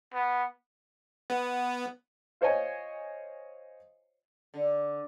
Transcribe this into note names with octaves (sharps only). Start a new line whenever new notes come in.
B3
B3
F4 C5 C#5 D#5 G#5
D3